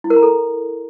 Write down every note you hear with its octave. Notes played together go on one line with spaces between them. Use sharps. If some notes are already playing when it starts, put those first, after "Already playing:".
E4
A#4
A#5
A4